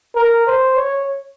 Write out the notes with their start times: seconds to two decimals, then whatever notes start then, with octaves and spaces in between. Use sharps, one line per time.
0.15 A#4
0.47 C5
0.77 C#5